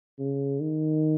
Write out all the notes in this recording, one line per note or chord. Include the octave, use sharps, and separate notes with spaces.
C#3
D#3